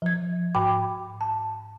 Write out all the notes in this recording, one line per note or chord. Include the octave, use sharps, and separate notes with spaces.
F3 G#6
G#2 G5 B5 D6
A5